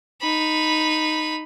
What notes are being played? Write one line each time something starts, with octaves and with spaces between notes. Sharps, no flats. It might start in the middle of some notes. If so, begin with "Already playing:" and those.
D#4 B5